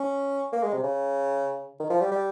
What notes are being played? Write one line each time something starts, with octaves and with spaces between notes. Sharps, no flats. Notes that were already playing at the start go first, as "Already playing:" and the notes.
Already playing: C#4
A#3
G#3
C3
C#3
D#3
F3
G3
G3